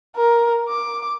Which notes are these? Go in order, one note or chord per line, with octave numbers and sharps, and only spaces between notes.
A#4
D6